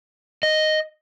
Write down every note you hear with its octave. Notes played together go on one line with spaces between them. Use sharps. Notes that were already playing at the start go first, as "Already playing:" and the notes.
D#5